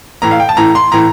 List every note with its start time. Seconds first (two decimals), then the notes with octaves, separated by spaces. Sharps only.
0.22 A2 E3 A#5
0.31 F5
0.40 G5
0.49 A5
0.57 A2 E3 A#5
0.75 C6
0.91 A2 E3 A#5